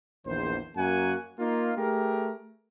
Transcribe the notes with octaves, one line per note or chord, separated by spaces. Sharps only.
A#1 E2 D#3 C5
F#2 A#3 F#4 F#5 G#5
A#3 D#4 F4
A3 G4 G#4 A#4